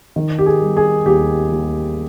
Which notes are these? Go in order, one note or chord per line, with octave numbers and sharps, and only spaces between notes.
D#3
G4
G#4
G3
G#4
D#2 G4
D#2